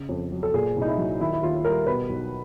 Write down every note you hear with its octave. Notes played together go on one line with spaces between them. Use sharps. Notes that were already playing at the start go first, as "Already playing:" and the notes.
Already playing: C#3
F2
F#3
A4
A#2 G#4
C2 D#4
E4
F#3
D#3 E4
E4
D#2 F4
G3 A#4
B2 B4
B1